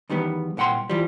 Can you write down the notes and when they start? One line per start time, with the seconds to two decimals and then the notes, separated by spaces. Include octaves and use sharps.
0.10 E2 D#3 G3 B3
0.57 C2 A#2 F#5 G5 C6
0.90 E3 F3 G3